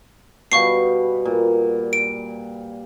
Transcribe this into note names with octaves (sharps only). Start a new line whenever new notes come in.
B2 G3 F5 C#6 C7
A#2
D7